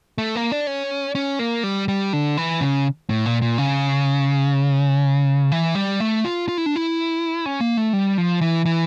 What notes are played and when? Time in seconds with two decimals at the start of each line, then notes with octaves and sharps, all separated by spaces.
0.18 A3
0.36 A#3
0.52 D4
0.67 C#4
1.15 C#4
1.39 A#3
1.63 G3
1.88 G3
2.13 D3
2.37 E3
2.61 C#3
3.10 A2
3.26 A#2
3.42 A#2
3.58 C#3
5.52 E3
5.75 G3
6.00 A3
6.25 F4
6.48 F4
6.58 E4
6.66 D4
6.76 E4
7.46 C#4
7.61 A#3
7.77 A3
7.93 G3
8.17 F3
8.41 E3
8.65 E3